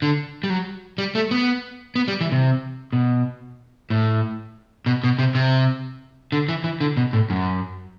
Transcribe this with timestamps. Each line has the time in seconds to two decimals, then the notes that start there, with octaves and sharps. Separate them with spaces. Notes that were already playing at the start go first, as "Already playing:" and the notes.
0.02 D3
0.44 G3
0.50 F#3
0.98 G3
1.15 A3
1.31 B3
1.96 B3
2.08 G3
2.21 E3
2.32 C3
2.93 B2
3.90 A2
4.86 B2
5.04 B2
5.19 C3
5.35 C3
6.32 D3
6.49 E3
6.64 E3
6.81 D3
6.97 B2
7.13 A2
7.30 F#2